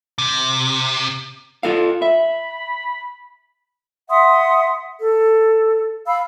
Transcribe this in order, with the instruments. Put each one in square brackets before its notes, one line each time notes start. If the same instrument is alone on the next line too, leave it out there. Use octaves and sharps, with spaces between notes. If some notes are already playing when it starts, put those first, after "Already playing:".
[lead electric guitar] C3
[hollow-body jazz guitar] F4 A4 F5
[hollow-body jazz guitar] E5 [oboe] B5
[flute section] E5 F#5 C6 D#6
A4
F5 B5 E6